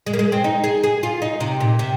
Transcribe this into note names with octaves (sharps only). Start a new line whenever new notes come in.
G#3
A#3
G#3
C4
D#4
G#4
G#4
F4
D#4
C3
A#2
C3